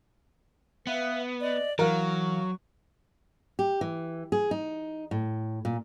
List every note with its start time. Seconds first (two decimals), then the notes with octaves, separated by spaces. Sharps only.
0.87 B3 B4 E5 F5
1.40 D5 D#5
1.79 E3 F#3 A#4 F5 C#6
3.59 G4
3.81 E3
4.32 G#4
4.51 D#4
5.11 A2
5.65 A#2